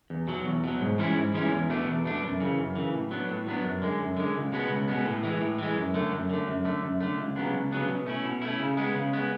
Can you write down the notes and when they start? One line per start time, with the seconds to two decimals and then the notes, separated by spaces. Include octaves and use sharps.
0.10 E2
0.28 B2 F#3
0.46 E2
0.64 B2 F#3
0.81 G#2
0.98 E3 G#3 C#4 E4
1.16 G#2
1.34 E3 G#3 C#4 E4
1.51 E2
1.70 B2 A3 D4
1.87 E2
2.05 B2 A3 D4
2.23 F#2
2.40 C#3 E3
2.58 F#2
2.76 C#3 E3
2.94 A2
3.11 F#3 B3 D4
3.29 A2
3.47 F#3 B3 D4
3.64 F#2
3.82 D3 G#3
3.99 F#2
4.17 D3 G#3
4.35 C#2
4.52 B2 G#3 B3
4.71 C#2
4.88 B2 G#3 B3
5.05 A2
5.23 E3 G#3
5.41 A2
5.58 E3 G#3
5.77 F#2
5.94 D3 A3
6.12 F#2
6.30 D3 A3
6.47 F#2
6.65 D3 A3
6.83 F#2
7.01 D3 A3
7.18 C#2
7.36 C#3 F#3 B3 D4
7.54 C#2
7.71 C#3 F#3 B3 D4
7.88 B2
8.06 A3 C#4 E4
8.25 B2
8.42 A3 C#4 E4
8.60 C#3
8.77 G#3 B3
8.95 C#3
9.13 G#3 B3